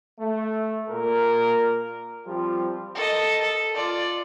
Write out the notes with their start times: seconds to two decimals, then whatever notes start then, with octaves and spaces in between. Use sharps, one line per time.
0.19 A3
0.90 A#2 A#4
2.26 F3 G3 C4 F4
2.95 A4 D#5
3.41 A4
3.75 F4 D5